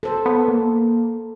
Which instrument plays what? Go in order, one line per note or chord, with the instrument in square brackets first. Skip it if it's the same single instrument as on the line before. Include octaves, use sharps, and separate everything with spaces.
[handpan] A4 C5
[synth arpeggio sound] B3
A#3